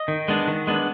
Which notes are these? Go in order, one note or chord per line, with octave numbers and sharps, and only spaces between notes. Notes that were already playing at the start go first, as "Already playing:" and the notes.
Already playing: D#5
D#3
G#3 B3 D4
D#3
G#3 B3 D4